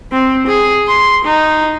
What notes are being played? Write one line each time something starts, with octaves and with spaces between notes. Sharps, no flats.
C4
G#4
C6
D#4